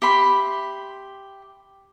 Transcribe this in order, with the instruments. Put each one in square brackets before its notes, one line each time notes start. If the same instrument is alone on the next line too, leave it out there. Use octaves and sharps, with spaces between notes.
[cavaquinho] G4 E5 B5 C6